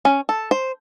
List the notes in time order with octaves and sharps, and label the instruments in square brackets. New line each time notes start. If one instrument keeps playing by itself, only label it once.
[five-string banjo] C#4
A4
C5